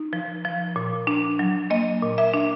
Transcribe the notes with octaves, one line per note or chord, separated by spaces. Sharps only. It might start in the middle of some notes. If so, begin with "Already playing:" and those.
Already playing: D#4
F3
F3
A#2
D4
F#3
A#3 D#5
A#2
E5
D4